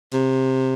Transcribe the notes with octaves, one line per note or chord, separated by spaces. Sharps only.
C3